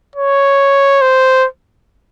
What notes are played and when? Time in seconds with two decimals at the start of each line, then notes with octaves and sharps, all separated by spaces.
0.16 C#5
1.02 C5